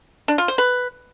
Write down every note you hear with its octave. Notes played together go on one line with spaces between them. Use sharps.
D4
F4
C5
B4